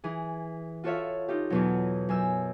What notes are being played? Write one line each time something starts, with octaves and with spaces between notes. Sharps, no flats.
E3 G#4
F4 F#4 A4 C#5 E5 F5
D#4 F4 G4
E2 B2 F#3
F#2 G#5 E6